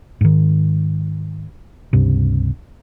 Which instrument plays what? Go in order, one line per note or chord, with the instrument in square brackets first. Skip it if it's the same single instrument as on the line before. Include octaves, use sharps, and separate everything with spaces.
[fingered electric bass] G#2 D#3
C#2 G2 C3